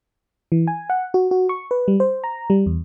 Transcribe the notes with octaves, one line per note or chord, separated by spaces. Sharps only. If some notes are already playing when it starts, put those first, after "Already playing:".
E3
G#5
F#5
F#4
F#4
C#6
B4
G3
C5
A#5
G3
E2